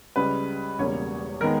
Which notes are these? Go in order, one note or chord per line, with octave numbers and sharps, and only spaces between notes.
C#2 C#3 G3 B4
E1 E2 C#3 G3 A#3 C#5
D#3 G#3 B3 A#4